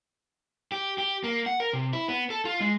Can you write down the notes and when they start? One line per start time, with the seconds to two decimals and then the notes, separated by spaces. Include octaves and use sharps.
0.72 G4
0.98 G4
1.24 A#3
1.46 F#5
1.60 A#4
1.73 C3
1.93 E4
2.08 B3
2.30 A4
2.45 F4
2.61 G#3